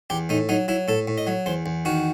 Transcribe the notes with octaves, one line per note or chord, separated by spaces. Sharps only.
E2 G4
A2 D#4
F#3 D#4
F#3 E4
A2 A4
A2
D#5
F#3
E2 C5
E2
D#3 F#4